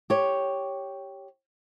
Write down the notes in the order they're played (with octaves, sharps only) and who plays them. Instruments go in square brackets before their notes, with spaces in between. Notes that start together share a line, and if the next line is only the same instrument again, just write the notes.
[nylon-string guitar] G4 C#5